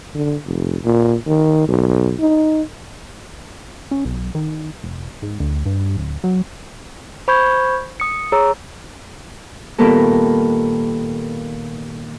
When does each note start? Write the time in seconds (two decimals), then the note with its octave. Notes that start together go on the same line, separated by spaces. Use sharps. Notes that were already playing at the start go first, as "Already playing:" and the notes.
0.15 D3
0.46 F1
0.85 A#2
1.27 D#3
1.68 B1
2.20 D#4
3.91 C#4
4.05 B1
4.35 D#3
4.84 F1
5.22 G#2
5.40 D2
5.65 G2
5.97 D1
6.24 F#3
7.28 C5 B5 C#6 G6 G#6
8.00 D#6 C#7
8.32 G#4 C#5 A#5 E6
9.78 A#2 D#3 G3 A#3 B3 A4